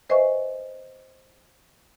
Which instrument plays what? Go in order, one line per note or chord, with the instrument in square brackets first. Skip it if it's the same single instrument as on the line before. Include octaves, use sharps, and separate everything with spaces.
[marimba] B4 C5 D#5 E5 G#5 C#6